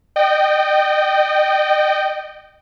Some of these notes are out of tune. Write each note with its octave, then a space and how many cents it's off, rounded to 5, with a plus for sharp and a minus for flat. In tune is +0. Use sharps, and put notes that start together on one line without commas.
D#5 -35 G5 -10